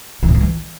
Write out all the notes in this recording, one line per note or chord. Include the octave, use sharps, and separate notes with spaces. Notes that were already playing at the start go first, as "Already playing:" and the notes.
E3
A2
F3
E3